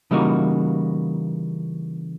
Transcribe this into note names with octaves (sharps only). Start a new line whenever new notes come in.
C#3 E3 G3 A#3 D#4 F#4